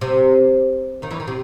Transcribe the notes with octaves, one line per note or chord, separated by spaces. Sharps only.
C3
D#2 D#3
E2 E3
D#3
C3